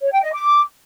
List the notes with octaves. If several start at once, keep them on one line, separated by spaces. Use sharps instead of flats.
C#5
G5
D#5
D6